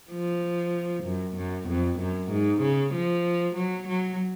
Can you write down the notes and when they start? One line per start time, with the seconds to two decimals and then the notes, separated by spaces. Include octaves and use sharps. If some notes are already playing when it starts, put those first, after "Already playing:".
0.11 F3
1.04 F#2
1.37 F#2
1.68 F2
2.00 F#2
2.31 G#2
2.62 C#3
2.94 F3
3.56 F#3
3.89 F#3